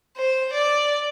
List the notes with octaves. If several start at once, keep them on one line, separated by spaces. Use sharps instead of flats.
C5
D5